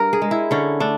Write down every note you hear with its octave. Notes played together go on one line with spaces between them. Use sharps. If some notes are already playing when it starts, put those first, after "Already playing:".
Already playing: G2 A#4
G#4
G#3
E4
D3 C#4
A3 D4